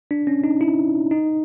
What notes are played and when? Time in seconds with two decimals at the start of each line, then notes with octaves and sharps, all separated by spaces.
0.11 D4
0.27 C#4
0.44 D#4
0.61 E4
1.11 D#4